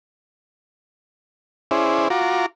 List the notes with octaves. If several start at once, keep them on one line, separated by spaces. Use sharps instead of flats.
C#4 E4 G#4 C5 D5
F4 F#4 A#5 D6